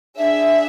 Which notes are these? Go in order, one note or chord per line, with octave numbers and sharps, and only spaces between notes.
D4 G#4 E5